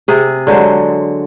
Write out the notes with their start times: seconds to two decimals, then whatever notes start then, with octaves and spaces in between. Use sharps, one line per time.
0.08 C3 G#4
0.47 D3 F#3 G#3 C5